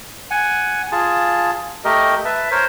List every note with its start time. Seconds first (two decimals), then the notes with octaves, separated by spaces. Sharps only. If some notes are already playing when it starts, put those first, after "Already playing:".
0.31 F#5 G#5
0.92 F4 G#4 A5
1.84 A3 G4 A#4 D#5
2.25 B4 E5 A5
2.51 A#4 C5 C#5